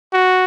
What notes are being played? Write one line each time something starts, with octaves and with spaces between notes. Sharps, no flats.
F#4